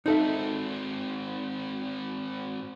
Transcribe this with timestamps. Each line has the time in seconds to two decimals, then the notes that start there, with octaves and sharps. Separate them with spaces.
0.06 G#2 C4 D#4 A4 E5